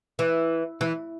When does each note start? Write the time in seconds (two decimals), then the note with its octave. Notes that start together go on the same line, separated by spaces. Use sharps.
0.19 E3
0.81 E3